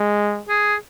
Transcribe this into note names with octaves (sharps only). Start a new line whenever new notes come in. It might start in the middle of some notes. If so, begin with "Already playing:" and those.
Already playing: G#3
G#4